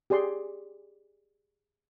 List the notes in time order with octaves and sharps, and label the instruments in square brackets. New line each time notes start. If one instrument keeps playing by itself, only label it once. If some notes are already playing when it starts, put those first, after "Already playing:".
[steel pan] G4 G#4 D5 C6